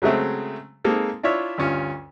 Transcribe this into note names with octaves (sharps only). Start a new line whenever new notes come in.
C#3 F#3 G#3 A3 C4
G#3 A#3 C4 D#4 A4
D4 E4 F4 C#5 E5
D2 G2 C#4 F4